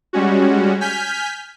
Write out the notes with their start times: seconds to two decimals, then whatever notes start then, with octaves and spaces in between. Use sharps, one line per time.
0.13 G3 G#3 C#4 F#4
0.81 G#5 F6 G6 B6